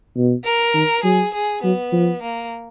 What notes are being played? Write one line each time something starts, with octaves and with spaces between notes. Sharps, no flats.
B2
A#4
D#3
F#3 G#4
G#4
F#3 B3
F3
A#3